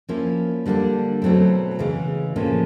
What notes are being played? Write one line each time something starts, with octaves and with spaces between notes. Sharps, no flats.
F3 A#3 C#4 E4
D3 G3 A#3 D4
B2 F#3 A3 C4 E4
C#3 E3 G#3
A2 F3 A#3 C#4